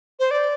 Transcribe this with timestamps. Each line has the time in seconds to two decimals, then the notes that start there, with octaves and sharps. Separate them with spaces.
0.20 C5
0.31 D5